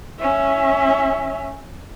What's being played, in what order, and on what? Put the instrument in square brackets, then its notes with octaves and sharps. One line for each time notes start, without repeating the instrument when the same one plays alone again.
[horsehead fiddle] C#4 E5